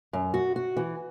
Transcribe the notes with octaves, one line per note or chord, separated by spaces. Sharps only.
F#2
F#4
F#4
E3